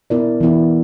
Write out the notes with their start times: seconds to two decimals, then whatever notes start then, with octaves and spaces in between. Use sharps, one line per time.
0.10 B3 E4 A#4 D5
0.41 E3 B3 E4